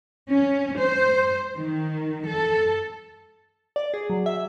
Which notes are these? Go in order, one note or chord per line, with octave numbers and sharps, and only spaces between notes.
C#4
C5
D#3
A4
D5
G#4
F#3
E5